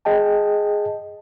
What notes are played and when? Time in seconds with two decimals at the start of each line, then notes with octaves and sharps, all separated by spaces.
0.05 G#4 D#5 G5 A5